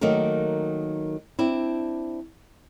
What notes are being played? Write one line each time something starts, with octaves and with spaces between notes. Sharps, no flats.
D#3 F#3 A3 A#3 A#4
C4 D4 E4